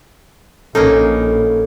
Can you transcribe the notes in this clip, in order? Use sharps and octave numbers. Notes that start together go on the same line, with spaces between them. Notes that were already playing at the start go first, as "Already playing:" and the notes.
A#1 A#3 C#4 D#4 A4